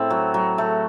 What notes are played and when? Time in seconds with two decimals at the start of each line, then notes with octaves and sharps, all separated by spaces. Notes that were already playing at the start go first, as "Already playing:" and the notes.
Already playing: A2 C4
0.10 F#3
0.34 F#3
0.58 A3